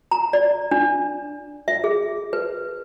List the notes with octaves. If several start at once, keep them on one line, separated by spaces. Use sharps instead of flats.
A#5
D5
D4
E5
G#4
B4